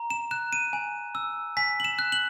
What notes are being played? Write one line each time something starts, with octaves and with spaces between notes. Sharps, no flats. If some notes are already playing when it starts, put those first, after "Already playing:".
Already playing: A#5
E7
F#6 E7
D#7
G#5
E6
G#5 B6
F#7
E7
F#6
F#7